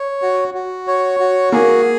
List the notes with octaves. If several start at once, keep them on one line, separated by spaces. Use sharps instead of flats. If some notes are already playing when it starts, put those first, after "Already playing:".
Already playing: C#5
F#4
F#4
C#5
F#4
A#3 G#4